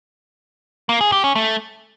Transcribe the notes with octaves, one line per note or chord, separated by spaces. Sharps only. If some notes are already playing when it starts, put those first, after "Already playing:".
A#3
G#4
G4
C#4
A3